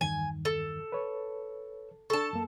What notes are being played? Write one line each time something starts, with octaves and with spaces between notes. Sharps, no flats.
E2 G2 D#3 G#5
A4
B4 C#5
D4 A4 A5 C#6
F#2 A#3